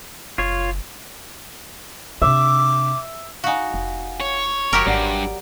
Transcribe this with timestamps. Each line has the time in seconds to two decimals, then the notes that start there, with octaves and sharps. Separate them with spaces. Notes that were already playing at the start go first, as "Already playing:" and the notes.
0.38 F#1 F4 C#5
2.22 C3 D4 E5 D6
3.44 D#4 F#4 F5 F#5 G#5
3.74 F1
4.20 C#5
4.73 F#1 F#3 G4 A#4
4.87 G#1 G2 D5 F#5 D7